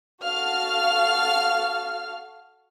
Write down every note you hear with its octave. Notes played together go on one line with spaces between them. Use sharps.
F#4 A4 F5 F6